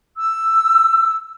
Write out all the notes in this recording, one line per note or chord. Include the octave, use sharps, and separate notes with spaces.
E6